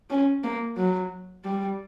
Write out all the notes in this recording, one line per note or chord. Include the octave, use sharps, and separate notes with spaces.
C#4
A#3
F#3
G3